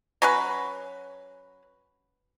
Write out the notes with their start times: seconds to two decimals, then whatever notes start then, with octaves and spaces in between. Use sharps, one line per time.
0.22 F#3 C#4 B4